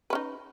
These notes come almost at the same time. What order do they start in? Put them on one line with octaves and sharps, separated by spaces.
B4 C#4 D#4